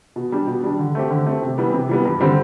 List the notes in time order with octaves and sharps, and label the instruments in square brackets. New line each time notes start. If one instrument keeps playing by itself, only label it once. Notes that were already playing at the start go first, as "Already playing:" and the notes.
[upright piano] B2
G3 D4
B2
G3 D4
D3
A3 C4 G4
D3
A3 C4 G4
C3
E3 G3 B3
C3
E3 G3 B3
G2
D3 G3 C4